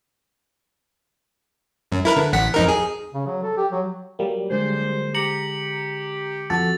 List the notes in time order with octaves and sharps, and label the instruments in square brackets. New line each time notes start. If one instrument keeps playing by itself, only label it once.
[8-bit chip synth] F#2
E4 A#4 B4
D3
A1 F#5 B6
F2 D#4 A#4
G#4
[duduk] C#3
F#3
A4
G4
F#3
[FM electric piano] F#3 G3 A#3
[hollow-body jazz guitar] D3 G#3 [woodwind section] C5
[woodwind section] G4 [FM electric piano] A#5 [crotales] C#7 F#7
[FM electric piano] F2 F#4 A4 [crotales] A6